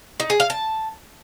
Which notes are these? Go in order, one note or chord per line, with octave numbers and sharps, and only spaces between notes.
D#4
G#4
F5
A5